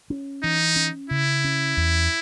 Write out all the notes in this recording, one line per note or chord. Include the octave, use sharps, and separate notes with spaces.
C#4
E3 D#4
C#4
C#3 E4
C#4
E2